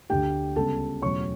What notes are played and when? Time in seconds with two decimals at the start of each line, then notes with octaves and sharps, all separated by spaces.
0.10 D2 D3 A3 G4 G5
0.56 C#2 C#3 G3 B3 A4 A5
1.02 E1 E2 C#3 F#3 A3 C#5 C#6